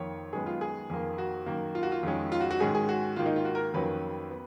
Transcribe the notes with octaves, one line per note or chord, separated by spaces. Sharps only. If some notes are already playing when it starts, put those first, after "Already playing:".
Already playing: F2 D#3 A#3 C#5
F#2 D#3 G#3 B3 G#4
F4
G#4
F2 D#3 A#3
F#4
F#2 D#3 A#3
F4
F#4
F4
F2 D#3 G#3 C#4
F4
F#4
F#4
G#2 D#3 G#3 C#4 G#4
G#4
F#4
G#2 D#3 A#3 F4
D#4
F4
F#4
A#4
F2 D#3 F#3 A#3 C#4 B4
B3